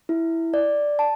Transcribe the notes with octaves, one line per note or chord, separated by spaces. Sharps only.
E4
D5
A5